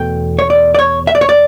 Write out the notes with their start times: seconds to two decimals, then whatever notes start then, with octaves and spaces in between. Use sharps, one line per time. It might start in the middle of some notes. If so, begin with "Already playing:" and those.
Already playing: E2 B2 A3 G5
0.39 C#5
0.50 D5
0.75 D5
0.79 C#5
1.07 E5
1.15 D5
1.21 C#5
1.29 D5